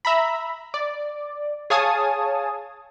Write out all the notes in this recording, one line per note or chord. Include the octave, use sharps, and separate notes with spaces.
E5 A#5 B5
D5
G#4 C#5 F5 G#5 A5 D#6